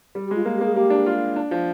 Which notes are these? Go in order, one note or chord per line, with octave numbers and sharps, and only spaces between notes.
G3
G4
G#3 F4
A#3
G4
A#3 G#4
A#3 G4
D4
F4
D4
F3